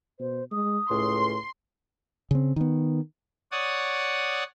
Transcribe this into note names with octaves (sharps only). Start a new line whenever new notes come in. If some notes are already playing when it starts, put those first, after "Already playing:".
B2 C5
G#3 D#6
C#2 A2 C6
C#3 C4
D#3 B3
C#5 D5 F#5 D#6